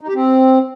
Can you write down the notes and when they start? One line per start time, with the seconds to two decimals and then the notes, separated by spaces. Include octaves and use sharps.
0.01 D#4
0.08 G4
0.15 C4